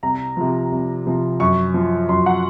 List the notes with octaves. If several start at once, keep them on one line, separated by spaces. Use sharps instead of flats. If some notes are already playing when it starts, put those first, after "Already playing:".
C2 A#5
C3 F3
C2
C3 F3
F#2 C#6
F3
F#2 C6
F#5